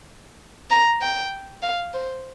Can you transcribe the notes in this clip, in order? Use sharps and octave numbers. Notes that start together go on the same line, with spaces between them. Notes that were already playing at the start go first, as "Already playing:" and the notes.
A#5
G5
F5
C5